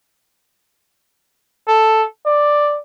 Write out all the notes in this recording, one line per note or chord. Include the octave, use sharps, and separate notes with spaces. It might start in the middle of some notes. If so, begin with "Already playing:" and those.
A4
D5